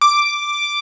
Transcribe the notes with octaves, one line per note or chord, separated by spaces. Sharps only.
D6